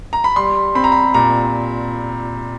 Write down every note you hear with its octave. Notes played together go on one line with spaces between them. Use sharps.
A#5
B5
G3 C6
C4 B5
A#5
B5
A#2 A#5